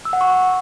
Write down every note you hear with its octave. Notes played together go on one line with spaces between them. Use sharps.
E6
F#5
C#6